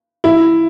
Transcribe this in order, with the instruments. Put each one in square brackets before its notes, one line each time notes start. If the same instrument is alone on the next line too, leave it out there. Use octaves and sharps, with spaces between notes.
[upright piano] E4